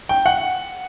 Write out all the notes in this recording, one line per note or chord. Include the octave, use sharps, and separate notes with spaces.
G5
F#5